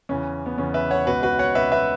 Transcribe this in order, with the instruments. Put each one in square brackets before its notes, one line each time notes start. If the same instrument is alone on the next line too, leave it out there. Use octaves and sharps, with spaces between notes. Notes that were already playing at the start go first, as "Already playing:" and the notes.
[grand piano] E2 C#3 E3 C#4
B3
E2 C#3 E3 C#4
B4 E5
C#5 F#5
C#2 B2 F#4 B4
F#4 B4
C#5 F#5
C#2 B2 B4 E5
B4 E5